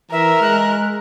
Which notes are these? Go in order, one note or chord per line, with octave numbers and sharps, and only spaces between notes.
E3 A#4 E5
G#3 F#6